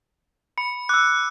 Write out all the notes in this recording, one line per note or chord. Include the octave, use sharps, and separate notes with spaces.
B5 C#7
D6 E6 F#6